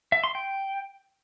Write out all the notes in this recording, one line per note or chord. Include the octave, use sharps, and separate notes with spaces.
E5
C6
G5